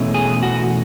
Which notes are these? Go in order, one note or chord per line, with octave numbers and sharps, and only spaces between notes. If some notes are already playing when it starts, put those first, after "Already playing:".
Already playing: E2 B2 A3 C#4
G#4
F#4